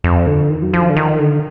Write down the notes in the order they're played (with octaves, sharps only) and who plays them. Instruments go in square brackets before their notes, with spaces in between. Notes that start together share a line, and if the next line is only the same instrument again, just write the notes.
[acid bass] F2
D3
D#3
F#3
F3
D3
D#3
D3